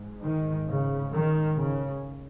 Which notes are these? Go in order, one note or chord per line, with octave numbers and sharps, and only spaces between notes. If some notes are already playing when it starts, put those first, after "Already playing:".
Already playing: G#2
D#3
C#3
D#3
C#3